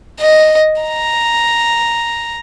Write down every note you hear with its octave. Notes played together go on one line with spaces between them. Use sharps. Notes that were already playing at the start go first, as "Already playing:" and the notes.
D#5
A#5